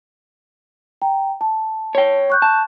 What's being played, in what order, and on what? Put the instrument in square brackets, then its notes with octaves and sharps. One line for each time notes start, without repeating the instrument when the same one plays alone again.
[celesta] G5 A#5
A5
[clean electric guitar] C#5 G5
[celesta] C#6 F#6 G6
[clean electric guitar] A5